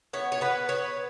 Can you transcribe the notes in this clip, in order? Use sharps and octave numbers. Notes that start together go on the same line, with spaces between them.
B3 C#5
C#5
B3 B4
B3 C#5